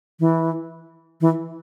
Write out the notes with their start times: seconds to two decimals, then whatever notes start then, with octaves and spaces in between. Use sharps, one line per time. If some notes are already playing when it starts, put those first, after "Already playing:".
0.20 E3
1.21 E3